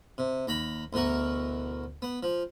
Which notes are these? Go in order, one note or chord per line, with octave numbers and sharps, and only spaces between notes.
C3
D#2 A#5 B5
D2 B2 E3 A#4 C#6
B3
F3